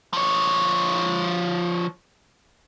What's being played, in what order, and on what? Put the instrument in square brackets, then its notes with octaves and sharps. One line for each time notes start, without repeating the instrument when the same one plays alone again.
[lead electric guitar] F3 C#5